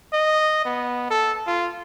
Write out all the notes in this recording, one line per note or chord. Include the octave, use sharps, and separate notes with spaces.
D#5
B3
A4
F4